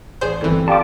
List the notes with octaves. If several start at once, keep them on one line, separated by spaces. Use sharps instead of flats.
A1 G#4 C5 D5
G1 E3 C4 A4
F4 G4 D5 A5 D6